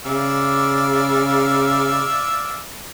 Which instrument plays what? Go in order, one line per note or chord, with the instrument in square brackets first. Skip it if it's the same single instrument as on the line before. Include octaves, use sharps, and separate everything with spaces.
[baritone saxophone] C#3 [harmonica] D5 E5 F5